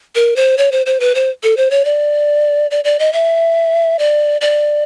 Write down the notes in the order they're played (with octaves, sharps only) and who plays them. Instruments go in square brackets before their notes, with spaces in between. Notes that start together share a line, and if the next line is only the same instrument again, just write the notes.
[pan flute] A#4
C5
C#5
C5
C5
B4
C5
A4
C5
C#5
D5
D5
D5
D#5
E5
D5
D5